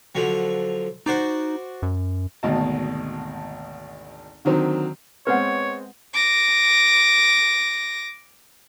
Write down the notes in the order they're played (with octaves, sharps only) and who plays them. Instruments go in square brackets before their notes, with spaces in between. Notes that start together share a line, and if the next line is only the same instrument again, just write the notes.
[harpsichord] D3 F3 F#3
[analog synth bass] D#4 [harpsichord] F#4 C5 D5
[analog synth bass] F#2
[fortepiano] G#1 D2 B2 D#5 A5
D3 D#3 F#3 C4
[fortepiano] G#3 B3 C4 [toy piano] B4 F#5 [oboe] C#5
[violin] D6 A#6